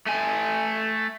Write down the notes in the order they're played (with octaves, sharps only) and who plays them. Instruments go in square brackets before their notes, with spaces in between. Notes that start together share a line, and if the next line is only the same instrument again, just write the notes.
[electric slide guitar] A3 G#5